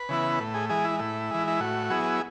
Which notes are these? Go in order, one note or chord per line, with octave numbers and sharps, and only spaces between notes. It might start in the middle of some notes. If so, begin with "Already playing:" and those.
Already playing: B4
C#3 E3 B3 E4
A2
G#4
E3 G#3 G#4
E4
A2 E4
E3 G#3
E4
A2 F#4
F#3 B3 E4 G#4